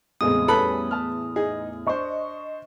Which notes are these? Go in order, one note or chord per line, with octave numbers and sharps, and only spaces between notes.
E2 A2 C#3 G#3 C4 D#6
G3 C#4 A4 B4 B5
A5 F6
D#4 G#4
D4 C5 D#5 C#6